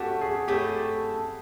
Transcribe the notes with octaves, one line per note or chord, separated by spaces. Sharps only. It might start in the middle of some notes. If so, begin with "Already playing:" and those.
Already playing: A3 C#4 F#4 G4 A4
G#4
A3 C#4 E4 G4 A4